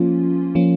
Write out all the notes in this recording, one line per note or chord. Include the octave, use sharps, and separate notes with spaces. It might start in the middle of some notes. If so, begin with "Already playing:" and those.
Already playing: F3 A#3 C#4 F4
F3 A#3 C#4 F4